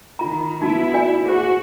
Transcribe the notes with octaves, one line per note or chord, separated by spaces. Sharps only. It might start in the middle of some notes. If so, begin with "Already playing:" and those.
D#3 F4 A#5
B3 D#4 E4 F#4 A5
F#4 D5 G#5
F#4 G#4 C5